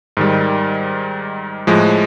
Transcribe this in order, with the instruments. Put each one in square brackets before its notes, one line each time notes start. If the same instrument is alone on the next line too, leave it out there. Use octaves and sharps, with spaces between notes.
[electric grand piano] G#2 D#3 G3
A2 F3 G#3